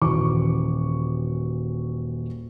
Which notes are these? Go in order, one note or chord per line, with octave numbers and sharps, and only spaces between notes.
D#1 E3 F#4 C#6 D6